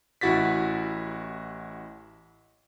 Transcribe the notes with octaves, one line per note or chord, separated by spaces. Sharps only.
A1 E4 F#4 A6 B6